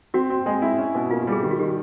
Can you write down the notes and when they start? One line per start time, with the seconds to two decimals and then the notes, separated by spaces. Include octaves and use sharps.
0.14 C4 F#4
0.30 C4
0.46 G#3
0.62 E4
0.78 C#4
0.95 B2
1.11 A#3 F4
1.22 F#4
1.27 G3
1.32 G#4
1.43 D#3 G4
1.51 F#4
1.59 D#3 G4